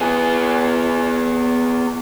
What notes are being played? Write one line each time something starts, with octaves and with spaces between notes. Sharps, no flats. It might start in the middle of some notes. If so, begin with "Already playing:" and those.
B3 G#4